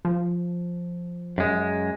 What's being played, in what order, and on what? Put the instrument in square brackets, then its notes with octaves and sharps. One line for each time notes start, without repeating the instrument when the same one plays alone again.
[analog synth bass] F3
[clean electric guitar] F#2 G#3